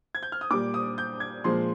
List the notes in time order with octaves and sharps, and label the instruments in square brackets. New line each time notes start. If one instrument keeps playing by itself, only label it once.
[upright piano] G#6
G6
F6
D#6
A#2 G3 D6
D#6
G6
G#6
A#2 F3 G#3 C6